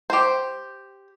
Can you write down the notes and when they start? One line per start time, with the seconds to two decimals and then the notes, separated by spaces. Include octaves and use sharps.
0.10 G4 C5